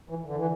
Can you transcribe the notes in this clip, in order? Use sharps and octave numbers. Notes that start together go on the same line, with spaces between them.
E3
D3
E3